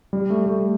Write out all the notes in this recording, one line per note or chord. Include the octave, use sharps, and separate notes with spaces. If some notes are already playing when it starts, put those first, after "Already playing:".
G3
A3
A3